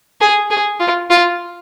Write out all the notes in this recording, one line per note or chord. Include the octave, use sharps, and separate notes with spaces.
G#4
G#4
F4
F4